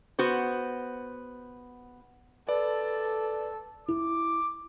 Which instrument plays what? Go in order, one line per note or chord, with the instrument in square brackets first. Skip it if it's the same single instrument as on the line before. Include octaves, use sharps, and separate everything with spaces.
[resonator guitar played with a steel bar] B3 F#4 C5
[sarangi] A4 [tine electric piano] B4 [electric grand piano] D5
[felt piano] E4 [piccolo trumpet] D6